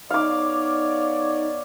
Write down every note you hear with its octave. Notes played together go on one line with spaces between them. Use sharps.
B3 D#4 C#5 D5 F5 D6